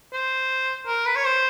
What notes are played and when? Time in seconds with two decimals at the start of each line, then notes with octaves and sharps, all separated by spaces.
0.13 C5
0.87 A#4
1.06 B4
1.16 C#5
1.25 C5